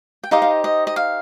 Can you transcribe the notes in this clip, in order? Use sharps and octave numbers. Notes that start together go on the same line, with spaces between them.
G5
D#4 G4 C5 D#5 F5
F5
D#5
D#5
F5